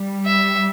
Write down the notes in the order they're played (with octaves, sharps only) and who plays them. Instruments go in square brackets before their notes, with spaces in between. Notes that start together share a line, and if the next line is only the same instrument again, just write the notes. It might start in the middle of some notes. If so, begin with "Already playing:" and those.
Already playing: [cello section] G3
[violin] E5